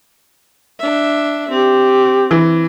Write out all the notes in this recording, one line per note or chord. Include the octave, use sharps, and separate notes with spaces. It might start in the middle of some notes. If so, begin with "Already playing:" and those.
D4 E5
C4 G4
E3